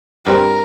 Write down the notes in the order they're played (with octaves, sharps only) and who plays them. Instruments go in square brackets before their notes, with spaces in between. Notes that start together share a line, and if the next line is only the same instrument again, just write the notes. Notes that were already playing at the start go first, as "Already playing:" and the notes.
[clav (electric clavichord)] G2 G3 C4 [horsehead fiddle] A#4